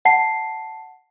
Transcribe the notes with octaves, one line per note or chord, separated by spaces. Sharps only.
F#5 A5 C7